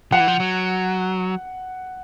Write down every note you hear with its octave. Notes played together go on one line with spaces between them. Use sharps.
F3 F#5
E3
F3
F#3